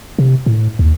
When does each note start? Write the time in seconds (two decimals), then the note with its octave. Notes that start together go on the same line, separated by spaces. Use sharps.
0.19 C3
0.46 A2
0.79 D#2